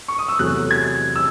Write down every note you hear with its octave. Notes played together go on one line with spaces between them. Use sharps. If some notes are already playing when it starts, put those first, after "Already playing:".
C#6
D#6
E6
E2 C3 F#3 A3 F#6
G#6
E6